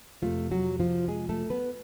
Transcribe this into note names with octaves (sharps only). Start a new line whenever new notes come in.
F2 C3 E3 F3 A3 F4
F#3 F#4
F3 F4
G#3 G#4
A3 A4
B3 B4